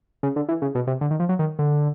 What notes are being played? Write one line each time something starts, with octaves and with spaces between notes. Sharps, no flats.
C#3
D3
E3
C#3
B2
C3
D3
D#3
F3
F#3
D#3
D3